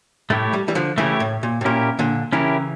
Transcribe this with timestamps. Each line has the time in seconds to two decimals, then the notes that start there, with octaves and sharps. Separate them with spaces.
0.30 A2 A3 E4 G4 C#5
0.53 G3
0.68 E3 G3
0.75 D3 F3
0.98 C#3 E3 A3 E4 G4 C#5
1.20 A2
1.43 A#2
1.61 A2
1.65 A#2 C#4 E4 G4 A#4
1.99 A#2 D3
2.33 C#3 E3 C#4 E4 G4 A#4